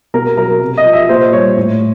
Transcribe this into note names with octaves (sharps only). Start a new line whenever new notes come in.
B2 A#4
F#3 A#4
C3
D#5
F3
E5
A#2 C5
G3 C#5
A2